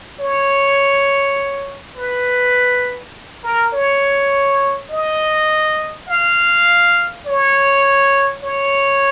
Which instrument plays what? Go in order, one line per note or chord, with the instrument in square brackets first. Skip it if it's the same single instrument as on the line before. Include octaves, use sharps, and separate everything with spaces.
[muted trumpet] C#5
B4
A#4
C#5
D#5
F5
C#5
C#5